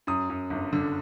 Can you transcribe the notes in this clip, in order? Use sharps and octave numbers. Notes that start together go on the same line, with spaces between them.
F#2 D#6
F#2
G1
D3